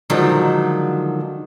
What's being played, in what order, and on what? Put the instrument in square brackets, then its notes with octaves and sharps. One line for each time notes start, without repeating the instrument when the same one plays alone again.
[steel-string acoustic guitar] D3 D#3 F3 F#3 G#3